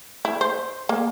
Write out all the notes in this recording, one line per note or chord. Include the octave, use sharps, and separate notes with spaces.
E4
C5
A#3